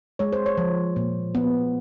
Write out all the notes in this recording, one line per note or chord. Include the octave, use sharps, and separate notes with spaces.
G#3 C#5
C5
C#5
F3
A#2
B3